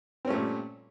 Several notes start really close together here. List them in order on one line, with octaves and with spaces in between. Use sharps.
C4 C#4 A3 A#2 G3